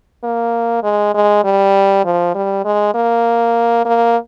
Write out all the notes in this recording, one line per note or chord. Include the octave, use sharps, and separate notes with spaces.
A#3
G#3
G#3
G3
F3
G3
G#3
A#3
A#3